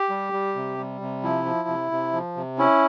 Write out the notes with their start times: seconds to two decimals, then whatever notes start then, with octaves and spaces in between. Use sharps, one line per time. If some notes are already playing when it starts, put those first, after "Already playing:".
Already playing: G4
0.10 G3
0.33 G3
0.55 C3
0.78 G3
1.01 C3
1.23 F3 E4
1.45 F3
1.68 C3
1.91 C3
2.13 F3
2.36 C3
2.58 C#4 E4